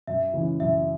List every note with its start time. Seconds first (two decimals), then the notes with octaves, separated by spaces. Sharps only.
0.07 F#2 E5
0.34 C#3 E3 G#3
0.60 F#2 E5